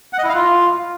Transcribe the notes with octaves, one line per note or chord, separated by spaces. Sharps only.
F#5
D#5
E4
F5
F4